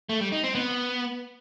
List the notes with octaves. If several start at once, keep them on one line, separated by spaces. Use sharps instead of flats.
A3
G3
D#4
C4
B3